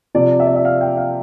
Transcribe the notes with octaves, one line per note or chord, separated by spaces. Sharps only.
C3 F3 D5
E5
D5
E5
F5
G5
F5